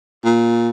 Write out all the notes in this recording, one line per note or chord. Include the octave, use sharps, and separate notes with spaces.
A#2